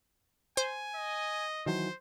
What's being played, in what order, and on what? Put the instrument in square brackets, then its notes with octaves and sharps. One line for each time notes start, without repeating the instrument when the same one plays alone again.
[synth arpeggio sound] C5 [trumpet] G#5
[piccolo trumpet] D#5
[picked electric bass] D#3 E3 F#3 [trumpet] C5